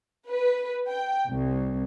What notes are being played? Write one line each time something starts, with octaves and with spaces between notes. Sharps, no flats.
B4
G5
C2